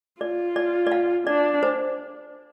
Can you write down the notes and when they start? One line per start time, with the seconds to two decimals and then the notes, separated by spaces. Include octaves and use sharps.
0.21 F4 D5
0.56 D5
0.87 D5
0.92 F5
1.27 D4 D5
1.63 C5